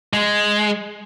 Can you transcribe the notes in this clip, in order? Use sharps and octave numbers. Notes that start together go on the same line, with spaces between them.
G#3